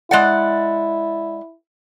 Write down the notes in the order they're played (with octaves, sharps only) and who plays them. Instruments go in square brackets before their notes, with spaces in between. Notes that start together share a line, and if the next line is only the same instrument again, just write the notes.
[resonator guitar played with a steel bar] G#3 D5 F#5 [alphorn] E4